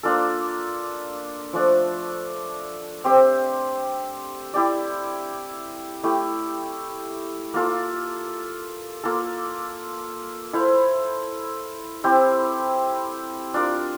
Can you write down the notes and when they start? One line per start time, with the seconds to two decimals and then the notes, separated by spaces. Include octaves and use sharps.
0.03 A#3 D4 F4 A4
1.53 F3 A3 D4
3.04 C4 G4 C5 E5
4.54 E4 G4 D5
6.04 A3 E4 G4
7.54 A#3 F4 A4
9.04 A#3 F4 A4
10.53 E4 A4 C5 F5
12.04 C4 E4 G4 C5
13.54 D4 F4 A#4